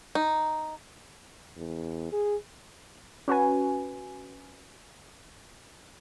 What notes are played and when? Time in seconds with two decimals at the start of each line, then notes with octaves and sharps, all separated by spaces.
0.15 D#4
1.57 E2
2.12 G#4
3.28 C#4 F#4 B4 G#5